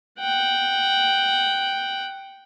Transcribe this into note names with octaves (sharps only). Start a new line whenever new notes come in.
F#5 G5